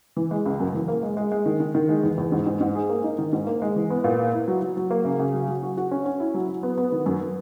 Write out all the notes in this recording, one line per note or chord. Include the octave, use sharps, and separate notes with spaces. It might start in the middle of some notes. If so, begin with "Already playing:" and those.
E3
G#3
C#2
F#2
E3
A#3
G#3
G#3
G#3
D#3
D#3
D#3
G#3
E2
E2
G#2
G#2
G#2
G#4
A#3
D#4
D#3
G#2
A#3
G#3
E3
B3
A#2
A#3
E4
F#3
F#3
F#3
A#3
C#3
C#3
F#3
F#3
F#4
F#4
C#4
C#4
E4
F#3
F#3
B3
B3
D#3
F#2